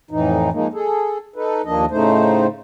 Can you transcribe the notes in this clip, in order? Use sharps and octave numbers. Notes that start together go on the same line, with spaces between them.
F2 A2 E3 D#4
F3 G#3 A#3 D#4
G#4 A4
D#4 A4 B4
D#2 F3 A#3 D4 D#5
A2 C#3 A3 D#4 C5